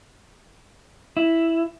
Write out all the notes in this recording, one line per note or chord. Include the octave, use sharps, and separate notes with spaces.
E4